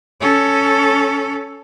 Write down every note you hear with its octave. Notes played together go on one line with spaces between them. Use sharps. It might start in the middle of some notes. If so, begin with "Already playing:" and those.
C#4 A4